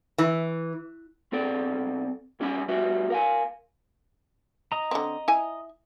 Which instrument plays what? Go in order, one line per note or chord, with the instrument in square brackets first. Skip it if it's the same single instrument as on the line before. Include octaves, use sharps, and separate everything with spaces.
[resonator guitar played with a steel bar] E3
[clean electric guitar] B1 C4 A4 D5
F#2 G3 C#4 D#5 B5
G3 F#4 B4 E5
A#4 F5 G#5
[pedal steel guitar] D#5 A#5
[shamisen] D3 C4
E4 G#5